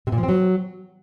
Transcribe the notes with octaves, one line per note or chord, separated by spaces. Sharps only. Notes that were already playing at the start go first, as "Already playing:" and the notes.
C3
A#2
F3
C4
F#3